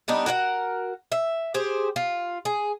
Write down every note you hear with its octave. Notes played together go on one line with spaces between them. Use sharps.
G3 B3 D4 D#4
F#4 A#4 C#5 F#5
E5
G4 G#4 C5
F4
G#4